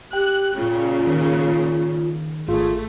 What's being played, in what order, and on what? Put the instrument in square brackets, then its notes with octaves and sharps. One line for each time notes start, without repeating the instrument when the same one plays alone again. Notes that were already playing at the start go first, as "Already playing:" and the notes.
[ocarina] G4 [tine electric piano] G5 [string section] F#6
[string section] A#2 C#3 [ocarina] F4
[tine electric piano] D#3
[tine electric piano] G#1 F4 [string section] A3 [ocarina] G#4